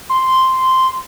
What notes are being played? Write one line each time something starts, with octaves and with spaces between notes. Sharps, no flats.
C6